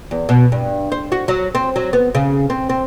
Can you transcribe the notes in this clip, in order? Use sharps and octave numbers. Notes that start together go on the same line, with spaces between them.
E2
B2
G2
C5
F#4
F#3
C4
F#3
B3
C#3
C4
C4